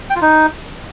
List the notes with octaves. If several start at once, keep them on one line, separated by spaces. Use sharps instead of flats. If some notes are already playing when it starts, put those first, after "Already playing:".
G5
F4
D#4